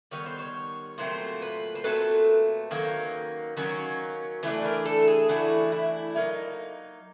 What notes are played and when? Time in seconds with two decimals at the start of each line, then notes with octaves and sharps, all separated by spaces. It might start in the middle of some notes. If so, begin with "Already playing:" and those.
0.11 D#3 G3 B3 C#5
0.26 C5
0.39 C#5
0.98 A#2 F#3 A3 C4 C5
1.42 B4
1.75 C5
1.84 A#2 F#3 A3 C4 B4
2.71 D#3 F#3 A#3 C#4
3.57 D#3 F#3 A#3 C#4
4.43 E3 A3 D4 B4
4.65 A#4
4.85 A4
5.07 G#4
5.29 E3 A3 D4 F#4
5.72 E4
6.16 F#3 A#3 D#4